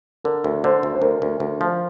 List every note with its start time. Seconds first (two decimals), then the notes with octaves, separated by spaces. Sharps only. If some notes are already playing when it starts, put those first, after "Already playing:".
0.24 D3 A#4
0.44 D2
0.64 D3 C5
0.83 D2
0.95 C5
1.02 D2 A#4
1.22 D2
1.40 D2
1.61 F3